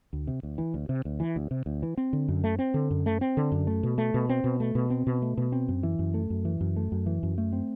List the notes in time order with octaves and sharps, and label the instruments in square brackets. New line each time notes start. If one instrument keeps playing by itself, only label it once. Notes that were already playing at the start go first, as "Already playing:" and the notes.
[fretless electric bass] D2
C3
D2
E3
D2
C3
D2
E3
D2
C3
D2
E3
C4
D3
F#2
A3
C4
D3
F#2
A3
C4
D3
F#2
A3
B2
A3
B2
C4
B2
A3
B2
C4
B2
A3
B2
C4
F#2
E3
F#2
A3
F#2
E3
F#2
A3
F#2
E3
F#2
A3
C4